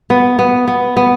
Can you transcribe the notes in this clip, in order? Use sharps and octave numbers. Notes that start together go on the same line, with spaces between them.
B3
B3
B3
B3